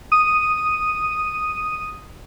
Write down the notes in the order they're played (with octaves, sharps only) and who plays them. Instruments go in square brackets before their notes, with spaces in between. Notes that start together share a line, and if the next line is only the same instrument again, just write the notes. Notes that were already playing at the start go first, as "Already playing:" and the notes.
[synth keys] D#6 D#7